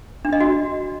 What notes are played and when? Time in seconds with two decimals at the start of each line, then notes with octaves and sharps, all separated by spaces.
0.25 D4
0.33 D#5
0.40 F#4